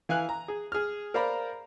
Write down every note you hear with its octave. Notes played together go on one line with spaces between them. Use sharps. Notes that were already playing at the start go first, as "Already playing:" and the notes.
E3 F5 G#5 F#6
A#5
G#4
G#4 F6
A#4 C5 D5 F5 A#5 B5